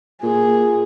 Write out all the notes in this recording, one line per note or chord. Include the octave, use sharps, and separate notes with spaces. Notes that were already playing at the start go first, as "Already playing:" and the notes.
A#2 G#4